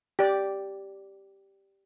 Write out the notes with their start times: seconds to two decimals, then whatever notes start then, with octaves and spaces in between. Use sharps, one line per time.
0.19 G4 D5